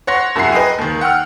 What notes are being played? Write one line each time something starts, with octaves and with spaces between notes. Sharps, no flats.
C#5 F#5 C6 A#6
C2 F#2 E4 G#4 F#5 C7
B4 D#5 G5 G#5
D#2 D#3
F#5 G5 E6 F6